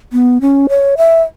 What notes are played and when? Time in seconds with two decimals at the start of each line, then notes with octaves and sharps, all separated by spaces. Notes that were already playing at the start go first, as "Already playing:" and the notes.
0.13 B3
0.41 C#4
0.69 C#5
0.97 E5